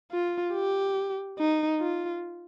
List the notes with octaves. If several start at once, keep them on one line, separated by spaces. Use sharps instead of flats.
F4
G4
D#4
F4